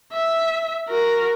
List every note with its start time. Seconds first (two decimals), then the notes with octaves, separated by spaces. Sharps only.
0.13 E5
0.88 F#4 A#4